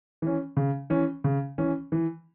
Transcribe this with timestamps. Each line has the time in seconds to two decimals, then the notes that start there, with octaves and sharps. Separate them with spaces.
0.22 E3 C#4
0.57 C#3
0.90 E3 C#4
1.24 C#3
1.58 E3 C#4
1.92 E3